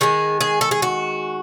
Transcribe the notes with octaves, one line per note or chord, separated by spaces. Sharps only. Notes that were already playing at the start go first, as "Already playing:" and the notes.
D#3 G#3 G#4
G#4
A4
G#4
F#4